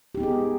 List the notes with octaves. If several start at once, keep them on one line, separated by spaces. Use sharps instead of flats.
B3 D#4 G4 G#4